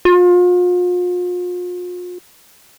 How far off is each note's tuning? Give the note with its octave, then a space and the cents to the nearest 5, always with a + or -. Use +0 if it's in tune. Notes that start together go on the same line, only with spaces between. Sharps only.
F4 +40